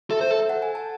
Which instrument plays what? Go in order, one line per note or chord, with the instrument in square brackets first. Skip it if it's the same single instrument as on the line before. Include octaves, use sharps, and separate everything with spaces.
[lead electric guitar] A4 [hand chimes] E5
[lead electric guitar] C5
A4
[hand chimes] F#5
G#5
A5